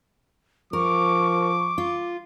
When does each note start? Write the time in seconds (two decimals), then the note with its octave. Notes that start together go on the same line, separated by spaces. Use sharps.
0.73 F3 A#4 C#6 D6
1.78 F4